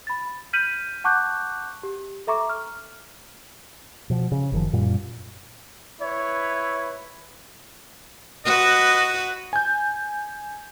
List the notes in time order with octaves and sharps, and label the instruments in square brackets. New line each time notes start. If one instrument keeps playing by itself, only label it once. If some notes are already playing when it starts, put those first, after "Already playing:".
[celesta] B5 A6
F6 G6 B6 D#7 F#7
F#5 A5 C#6 D6 F#6 G6
G4
A4 E5 A#5 C#6 D6
F6
[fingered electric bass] B2 F3
C#3
F#1 D#3 F3
F#2 A#2 G3
[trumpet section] E4 B4 C#5
[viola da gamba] F#4 B4 [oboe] D#5
[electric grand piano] G#5 G6